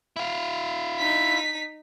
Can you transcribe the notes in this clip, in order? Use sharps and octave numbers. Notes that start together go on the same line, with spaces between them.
E4 F5
D#4 B6